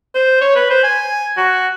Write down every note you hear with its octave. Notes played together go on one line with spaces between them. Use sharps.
C5
C#5
B4
C5
G#5
F#4